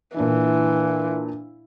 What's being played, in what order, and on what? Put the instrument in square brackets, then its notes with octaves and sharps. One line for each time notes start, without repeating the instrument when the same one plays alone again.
[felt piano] A#2 D4 E4 [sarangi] E3